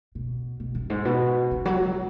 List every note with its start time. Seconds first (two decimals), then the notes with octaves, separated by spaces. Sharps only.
0.15 B2
0.60 B2
0.75 F#2
0.90 G#2
1.05 B2
1.51 C#3
1.65 F#3
1.81 G#3